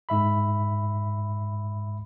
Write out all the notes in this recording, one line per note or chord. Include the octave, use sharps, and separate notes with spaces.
G#2 E5 B5